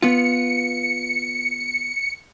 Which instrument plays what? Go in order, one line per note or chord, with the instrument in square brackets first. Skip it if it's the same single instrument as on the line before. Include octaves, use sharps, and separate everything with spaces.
[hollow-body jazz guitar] B3 F4 [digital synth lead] C#7